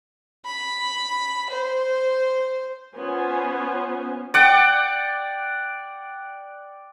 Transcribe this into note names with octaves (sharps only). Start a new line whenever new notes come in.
B5
C5
B3 C#4 F4 C5 C#5 G#5
D5 F#5 G5